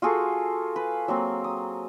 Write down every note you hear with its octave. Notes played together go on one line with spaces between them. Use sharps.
F4 F#4 G#4 A4
B4
F#3 A#3 C4
D#6